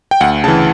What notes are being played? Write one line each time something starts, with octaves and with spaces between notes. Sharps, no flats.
G5
D2 F#5
C#3 E3 A5